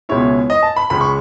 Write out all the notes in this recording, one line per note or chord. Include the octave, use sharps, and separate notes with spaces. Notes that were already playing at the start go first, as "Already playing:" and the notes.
C#2 B2 G#3 C#4 E4 C#5
D#5
A5
B5
C#2 C#3 G#3 B5
C#6